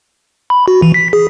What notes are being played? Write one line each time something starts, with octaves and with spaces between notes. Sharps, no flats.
B5
F#4
E3
B6
G#4